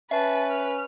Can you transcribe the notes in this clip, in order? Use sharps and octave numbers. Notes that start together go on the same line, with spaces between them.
C#4 B4 E5 A5
F6